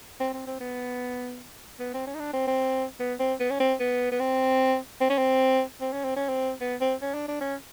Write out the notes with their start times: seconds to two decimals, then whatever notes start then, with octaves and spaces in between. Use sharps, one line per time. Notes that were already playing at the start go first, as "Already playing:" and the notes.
0.20 C4
0.34 C4
0.47 C4
0.60 B3
1.80 B3
1.94 C4
2.07 C#4
2.15 D#4
2.20 D4
2.34 C4
2.47 C4
3.00 B3
3.20 C4
3.40 B3
3.51 C#4
3.60 C4
3.80 B3
4.12 B3
4.20 C4
5.01 C4
5.10 C#4
5.18 C4
5.81 C4
5.93 C#4
6.05 C4
6.16 C#4
6.29 C4
6.61 B3
6.81 C4
7.02 C#4
7.14 D4
7.28 D4
7.41 C#4